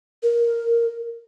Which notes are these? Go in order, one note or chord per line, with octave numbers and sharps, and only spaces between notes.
A#4